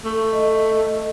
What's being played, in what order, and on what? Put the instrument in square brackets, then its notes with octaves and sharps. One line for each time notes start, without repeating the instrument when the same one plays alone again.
[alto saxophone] A3
[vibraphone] D#5